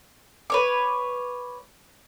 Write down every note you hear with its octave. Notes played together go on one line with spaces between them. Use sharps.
B4 C#5 D6